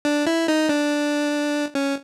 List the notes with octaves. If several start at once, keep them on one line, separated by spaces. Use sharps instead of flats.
D4
E4
D#4
D4
C#4